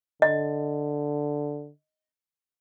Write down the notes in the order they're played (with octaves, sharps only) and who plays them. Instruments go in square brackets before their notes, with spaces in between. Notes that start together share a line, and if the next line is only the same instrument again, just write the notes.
[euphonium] D3 [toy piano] D#5